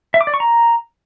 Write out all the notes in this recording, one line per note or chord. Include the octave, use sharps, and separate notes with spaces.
E5
D6
D5
C#6
A#5